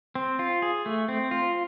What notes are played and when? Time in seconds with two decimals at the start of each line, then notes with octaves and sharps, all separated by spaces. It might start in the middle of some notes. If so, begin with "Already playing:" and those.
0.15 C4
0.39 F4
0.62 G#4
0.86 A3
1.09 C4
1.31 F4